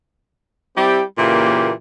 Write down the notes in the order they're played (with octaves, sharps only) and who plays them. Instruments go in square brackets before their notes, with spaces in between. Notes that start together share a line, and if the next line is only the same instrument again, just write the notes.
[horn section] G3 C4 E4 G4
A#2 C#3 E3 A#3 G4